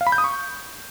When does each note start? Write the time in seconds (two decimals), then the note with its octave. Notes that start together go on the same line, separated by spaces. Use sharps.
0.01 F5
0.07 B5
0.12 G6
0.18 D#6
0.24 C#6